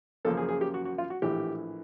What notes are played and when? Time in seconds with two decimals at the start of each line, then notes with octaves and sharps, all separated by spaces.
0.25 F#2 C#3 F3 A#3 A4
0.37 G#4
0.49 G#4
0.61 G4
0.74 F#4
0.85 F#4
0.98 F4
1.10 F#4
1.22 A#1 A2 E3 G4